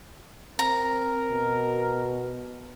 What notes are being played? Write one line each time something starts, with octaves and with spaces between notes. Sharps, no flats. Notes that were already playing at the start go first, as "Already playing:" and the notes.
C4 A#4 A#5
B2